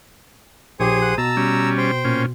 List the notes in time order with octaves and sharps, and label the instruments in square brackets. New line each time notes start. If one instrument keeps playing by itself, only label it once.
[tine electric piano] A#1 G4 [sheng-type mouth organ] G#4 C5 D#6 [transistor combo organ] C#5
[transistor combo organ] F#5
[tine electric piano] B2 [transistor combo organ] A5 [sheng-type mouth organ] A#5 E6
[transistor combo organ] G3 C#4
[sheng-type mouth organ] C5 G5
[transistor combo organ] A#2 C#4